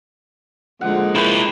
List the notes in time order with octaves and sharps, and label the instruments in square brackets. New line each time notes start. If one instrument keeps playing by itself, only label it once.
[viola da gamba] D3 G#3 D#4 [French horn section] F3 A#3 F4 [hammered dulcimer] F#5
[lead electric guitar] E4 A#4 [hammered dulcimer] B4 G5 C6